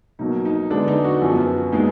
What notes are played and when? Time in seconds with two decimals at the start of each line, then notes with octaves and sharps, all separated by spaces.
0.19 B2 F#3 A#3 D#4
0.45 D#4
0.70 D3 G#3 B3 D4
0.88 D#4
1.05 F#4
1.22 F#2 F3 B3
1.72 A#2 G#3 B3 D#4